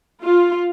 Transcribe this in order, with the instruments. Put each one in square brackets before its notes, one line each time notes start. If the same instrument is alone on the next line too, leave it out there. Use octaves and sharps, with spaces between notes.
[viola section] F4